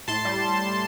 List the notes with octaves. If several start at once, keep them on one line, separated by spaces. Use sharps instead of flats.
A2 A5 C6
G3